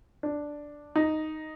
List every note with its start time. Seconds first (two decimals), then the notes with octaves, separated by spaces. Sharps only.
0.23 D4
0.96 D#4